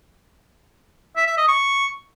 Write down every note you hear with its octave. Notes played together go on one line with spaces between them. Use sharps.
E5
E5
D#5
C#6